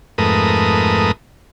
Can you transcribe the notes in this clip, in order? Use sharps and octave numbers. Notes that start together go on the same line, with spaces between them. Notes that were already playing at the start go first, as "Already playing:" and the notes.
F2 G#2 A3 A#4 B4 D#6